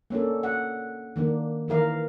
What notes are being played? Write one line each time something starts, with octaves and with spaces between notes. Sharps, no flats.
A#3 C#4 D4 A4
F#5
D#3 A#3 D4
D#3 E3 A#4 F5